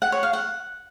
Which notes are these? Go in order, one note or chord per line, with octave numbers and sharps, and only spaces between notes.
F#5
C#5
F5
F#5